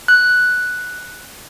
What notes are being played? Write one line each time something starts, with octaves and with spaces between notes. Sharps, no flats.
F#6